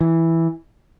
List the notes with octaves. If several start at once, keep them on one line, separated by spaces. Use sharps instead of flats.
E3